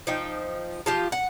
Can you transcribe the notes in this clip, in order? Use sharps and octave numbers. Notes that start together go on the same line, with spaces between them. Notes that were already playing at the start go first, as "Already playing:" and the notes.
F3 D#4 G5
F3 F4 G4
F#5